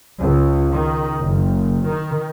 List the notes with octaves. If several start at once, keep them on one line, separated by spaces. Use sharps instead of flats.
C#2
D#3
F#1
D#3